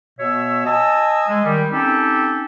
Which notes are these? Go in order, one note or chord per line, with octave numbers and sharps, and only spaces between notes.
B2 B3 C#5 E5 E6
D#5 G#5 A5 D#6 E6
G#3
D#3 G3
C4 C#4 D#4 G4 A4